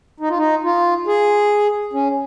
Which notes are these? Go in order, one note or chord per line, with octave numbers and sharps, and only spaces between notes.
D#4
F4
D#4
F4
G#4
C#4